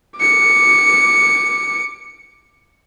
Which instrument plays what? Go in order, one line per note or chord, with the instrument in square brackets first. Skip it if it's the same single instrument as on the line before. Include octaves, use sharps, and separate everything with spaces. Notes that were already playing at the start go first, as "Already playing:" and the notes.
[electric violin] D6 C#7